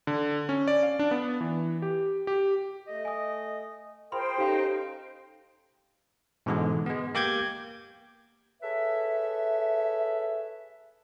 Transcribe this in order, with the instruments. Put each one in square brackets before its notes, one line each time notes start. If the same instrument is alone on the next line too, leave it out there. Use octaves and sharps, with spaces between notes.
[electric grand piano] D3
C#4
D5
F5
D4
B3
E3
G4
G4
[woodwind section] A3 D#5
[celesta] G#5 D#6
[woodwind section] F4 G#4 A#4 [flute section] C5 G5 [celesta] B5 C6
[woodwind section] C#4 D#4 [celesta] G4 A4 F5
[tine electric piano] G#2 B2 D3 E3 G#3
G#3 B3
A#3 G4 D6 G6 G#6
[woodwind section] G#4 A4 B4 C#5 E5